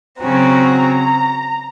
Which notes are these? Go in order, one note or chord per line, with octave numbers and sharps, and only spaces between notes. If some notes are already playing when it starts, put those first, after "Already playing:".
C#3 F#3 C4 F#4 A#5